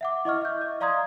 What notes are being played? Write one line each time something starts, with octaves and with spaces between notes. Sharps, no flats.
E5 F#5 D6
E4 D#5 C#6 F6
E5 G6
D#5
D5 F5 A#5 C6 D#6 G#6